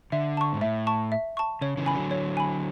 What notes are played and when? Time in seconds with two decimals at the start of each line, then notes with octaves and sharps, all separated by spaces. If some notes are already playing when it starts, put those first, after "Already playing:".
0.12 D3 E5
0.37 A5 C#6
0.53 G#2
0.61 A2 E5
0.87 A5 C#6
1.12 E5
1.37 A5 C#6
1.61 C#3 C#5
1.77 C#3 E3
1.86 G#5 B5
1.94 D3 F#3
2.11 C#5
2.37 G#5 B5